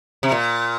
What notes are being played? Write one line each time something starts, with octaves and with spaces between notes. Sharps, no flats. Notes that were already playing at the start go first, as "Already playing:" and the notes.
C3
A#2